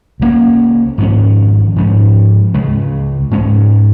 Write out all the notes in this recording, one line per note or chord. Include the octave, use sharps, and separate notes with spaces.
C#2 C#3 A#3 C#4
G#1 G#2 F3 C#4
G#2 F3 C#4
C#2 C#3 G#3
G#2 G#3 C#4